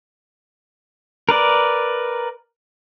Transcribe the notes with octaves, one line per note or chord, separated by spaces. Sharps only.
A#4 B4 D5